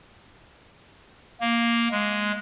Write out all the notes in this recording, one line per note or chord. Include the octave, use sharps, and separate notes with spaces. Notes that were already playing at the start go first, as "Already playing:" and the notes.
A#3
G#3